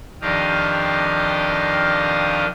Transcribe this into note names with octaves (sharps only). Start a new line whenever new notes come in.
F2 D#3 D4 G4 D#5 F5